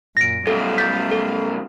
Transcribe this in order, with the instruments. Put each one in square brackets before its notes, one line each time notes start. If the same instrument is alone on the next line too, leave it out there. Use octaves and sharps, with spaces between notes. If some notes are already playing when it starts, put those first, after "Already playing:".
[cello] F#2 A#2 [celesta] A#6 D7
[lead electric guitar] F#2 B2 [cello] G3 F5 [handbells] A4
[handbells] G6 A6 [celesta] B6
[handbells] A4